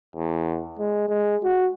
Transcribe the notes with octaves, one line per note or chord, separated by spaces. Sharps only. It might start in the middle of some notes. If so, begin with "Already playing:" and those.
E2
G#3
G#3
F#4